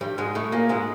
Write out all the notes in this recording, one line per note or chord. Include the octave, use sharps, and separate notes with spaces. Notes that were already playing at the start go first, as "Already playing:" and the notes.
G2 G3
G#2 G#3
A2 A3
A#2 A#3
G#2 G#3